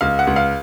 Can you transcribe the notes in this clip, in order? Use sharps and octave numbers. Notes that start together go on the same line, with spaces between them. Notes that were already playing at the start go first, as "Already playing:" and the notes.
C#2 F5
F#5
C#2
F5